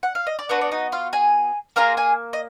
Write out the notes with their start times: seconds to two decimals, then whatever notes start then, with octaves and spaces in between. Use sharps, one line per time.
0.03 F#5
0.15 F5
0.27 D#5
0.39 D5
0.49 B3 D4 F#4 B4
0.61 D5
0.72 D#4 D#5
0.92 F4 F5
1.13 G#4 G#5
1.76 A#3 F4 G#4 A#4 A#5
1.97 G#4 G#5
2.33 D#5